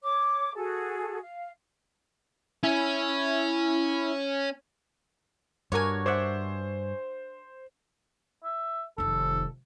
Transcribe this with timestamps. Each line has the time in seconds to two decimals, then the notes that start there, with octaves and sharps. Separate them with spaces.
0.03 C#5 D6
0.55 F#4 G#4 A4
1.21 F5
2.63 C#4 E4
5.72 G2 D4 F#4 A#4 C#5 G#5
6.06 C5 D5 E5 F#5
8.44 E5
8.98 F1 D#3 A4